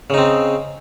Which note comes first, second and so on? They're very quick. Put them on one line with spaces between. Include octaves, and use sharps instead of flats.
C#3 D#4 C4